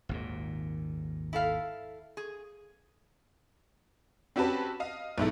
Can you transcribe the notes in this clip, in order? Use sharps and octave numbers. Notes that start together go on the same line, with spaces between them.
G#1 D#2 A#2
E4 A4 F5
G#4
C4 C#4 F#4 G4 B4 A5
D#5 F5
B1 G#2 E4 A4